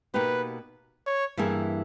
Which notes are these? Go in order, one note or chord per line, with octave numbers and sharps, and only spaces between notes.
B2 A#3 D#4 G4 B4
C#5
G2 E3 A#3 E4 G#4